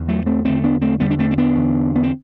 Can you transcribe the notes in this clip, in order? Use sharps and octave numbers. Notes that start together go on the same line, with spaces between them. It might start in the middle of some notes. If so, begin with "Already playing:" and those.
Already playing: E2 D3
F#3 A3
A3 C4
E2 D3 A3 C4
B3 D4
A3 C4
E2 D3 G3 B3
D4
A3 C4
C4
B3 D4
E2 D3
B3
C4